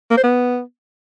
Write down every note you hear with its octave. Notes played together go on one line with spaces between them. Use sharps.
A#3
C5
B3